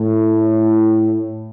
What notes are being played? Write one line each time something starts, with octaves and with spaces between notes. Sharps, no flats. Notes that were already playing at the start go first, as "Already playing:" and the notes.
Already playing: A2